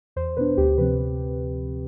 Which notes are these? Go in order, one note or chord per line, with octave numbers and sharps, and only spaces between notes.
E2 C5
B2 B3 D4 B4
D2 G4
C3 F3 C4 B4